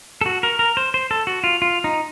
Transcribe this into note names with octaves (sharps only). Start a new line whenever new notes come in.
A4
F#4
A#4
A#4
C5
C5
A4
F#4
F4
F4
D#4